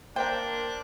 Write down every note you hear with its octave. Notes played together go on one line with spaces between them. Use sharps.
A#3 D4 A#4 C5 G5